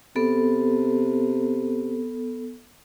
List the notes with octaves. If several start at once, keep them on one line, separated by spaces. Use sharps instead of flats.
C3 B3 A4